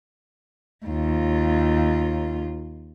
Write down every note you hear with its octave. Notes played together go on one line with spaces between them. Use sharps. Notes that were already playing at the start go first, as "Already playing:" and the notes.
D#2 F4